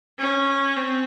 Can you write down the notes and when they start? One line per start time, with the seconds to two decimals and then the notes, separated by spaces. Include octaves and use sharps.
0.19 C#4
0.76 C4